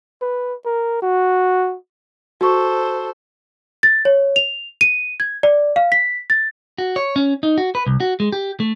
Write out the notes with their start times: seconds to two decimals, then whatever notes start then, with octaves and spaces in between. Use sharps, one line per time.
0.22 B4
0.65 A#4
1.02 F#4
2.41 F#4 A4 C5 C#6
3.83 A6
4.05 C#5
4.36 F7
4.81 D#7
5.20 G#6
5.43 D5
5.76 F5
5.92 B6
6.30 A6
6.78 F#4
6.96 C#5
7.16 C#4
7.43 D#4
7.58 F#4
7.75 B4
7.87 C2
8.00 F#4
8.20 G#3
8.32 G4
8.60 A3